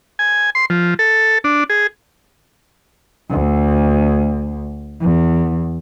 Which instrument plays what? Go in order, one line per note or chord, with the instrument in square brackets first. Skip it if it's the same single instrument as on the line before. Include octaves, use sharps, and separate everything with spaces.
[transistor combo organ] G#5
C6
F3
A4
D4
G#4
[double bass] D2
E2